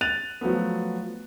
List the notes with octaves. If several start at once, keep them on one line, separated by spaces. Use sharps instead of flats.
F#6 A6 D#7 F7
F3 F#3 A3 B3